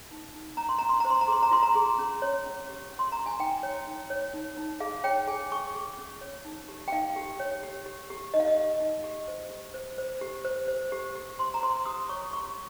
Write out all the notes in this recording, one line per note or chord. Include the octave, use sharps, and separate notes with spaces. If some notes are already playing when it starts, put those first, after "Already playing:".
D#4
D#4
C#4 A#5
C6
C#4 A#5
C6
C5 A#5
C6
A#5
G#4 C6
A#5
F4 C6
A#5
G#4
C#4
C#5
C#4
G4
C#4
C6
G4 A#5
G#5
D#4 G5
C#5
D#4
C#5
D#4
D#4
G#4 F5
C#5 G5
G#4 G#5
G#4 C#6
G#4
C#4
C#5
D#4
G4
G5
D#4 F5
G4
C#5
G4
G4
G4
D#4 D#5
F5
D#5
G4
D#4
G4
C5
G4
C5
C5
G4
C5
C5
G4
G4
C5 C6
A#5
C5 C6
G4 D#6
C#5 C#6
G4 C#6